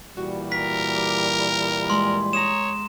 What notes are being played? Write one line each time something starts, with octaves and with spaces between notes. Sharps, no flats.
A#2 E3 G3 F#4
A#4 B6
D6
G#3 C6
C#5 A#5 D#6 E7